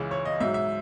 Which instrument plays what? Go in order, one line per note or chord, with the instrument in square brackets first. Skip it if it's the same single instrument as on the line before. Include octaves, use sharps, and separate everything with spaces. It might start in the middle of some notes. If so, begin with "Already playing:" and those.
Already playing: [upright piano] C#2 C#3 E3 G#3
C#5
D#5
G#2 F#3 E5
E5